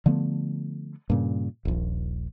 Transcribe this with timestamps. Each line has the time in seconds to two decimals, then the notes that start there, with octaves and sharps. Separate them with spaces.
0.06 D3 F3 A3 B3
1.10 G2 A#2 C#3
1.65 D#1 A#1